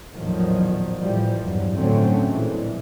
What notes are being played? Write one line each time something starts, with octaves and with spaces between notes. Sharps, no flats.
A1 E2 A#2 D#3 F3 F#3
A2 E3 F3 G3
E2 G2 F#3
A2 D3 F#3 A3 C4 C#4
A#2 E3 F3 G#3